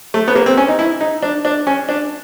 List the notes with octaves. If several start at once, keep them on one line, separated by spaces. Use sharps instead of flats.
A3
B3
A#3
C4
C#4
D#4
E4
D#4
D4
D4
C#4
D4